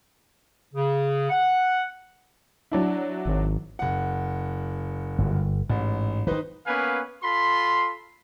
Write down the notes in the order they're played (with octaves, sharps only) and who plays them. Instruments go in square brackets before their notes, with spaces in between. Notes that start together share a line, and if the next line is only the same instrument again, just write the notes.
[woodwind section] C#3
F#5
[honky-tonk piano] F#3 D4 E4
[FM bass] G#1
[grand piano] F#1 F#5
[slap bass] G1
[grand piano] A1 [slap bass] G#2
[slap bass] D#3 E3 [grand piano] D#4 B4 C5
[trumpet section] A#3 B3 C#4 B4 F5 G#5
F4 A4 B5 C6